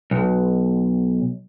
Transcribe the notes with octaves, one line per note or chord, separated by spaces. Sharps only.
B1